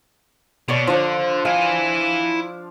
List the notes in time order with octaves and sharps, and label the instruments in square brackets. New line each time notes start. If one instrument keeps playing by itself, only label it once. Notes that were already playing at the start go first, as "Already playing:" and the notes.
[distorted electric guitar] B2 [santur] C#5 D5 C#6
[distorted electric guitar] D3 [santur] F3 D4
[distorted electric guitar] E4 G#5 [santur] F5